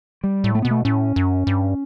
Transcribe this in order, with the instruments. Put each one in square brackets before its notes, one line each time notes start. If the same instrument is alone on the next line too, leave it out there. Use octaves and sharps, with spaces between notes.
[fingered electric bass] G3
[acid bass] A2
[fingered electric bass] A3
[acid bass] B2 [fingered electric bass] B3
[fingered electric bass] A3
[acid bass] A2 [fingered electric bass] C#4
[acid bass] F#2
G2